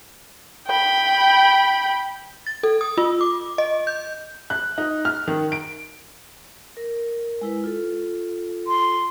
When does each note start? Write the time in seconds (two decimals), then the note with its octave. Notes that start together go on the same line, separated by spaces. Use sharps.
0.68 G5 B5
2.47 A6
2.63 A4
2.81 D#6
2.97 F4
3.21 D6
3.58 D#5
3.87 G6
4.50 F#6
4.78 D#4
5.05 F6
5.27 D#3
5.52 D7
6.77 A#4
7.41 G#3 E4 B4
7.64 F4 A4
8.67 C6